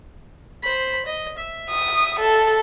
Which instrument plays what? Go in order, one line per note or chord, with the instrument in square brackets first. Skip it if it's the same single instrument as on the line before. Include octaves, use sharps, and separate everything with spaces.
[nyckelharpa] C5 B5
D#5
E5
[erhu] D#6
A4